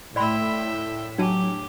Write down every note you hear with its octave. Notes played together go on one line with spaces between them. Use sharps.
A2 D5 E5 G5 B5 C6
F#3 D4 G4 G#5 A5